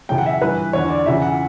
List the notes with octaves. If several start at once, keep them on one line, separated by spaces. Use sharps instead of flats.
F#2 C#3 E3 G5
F#5
E5
G2 E3 B4
E2 D3 C#5
D5
E2 C#3 E3 E5
F#5